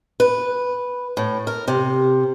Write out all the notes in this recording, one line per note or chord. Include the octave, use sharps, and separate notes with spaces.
B4
A2
A#4
C3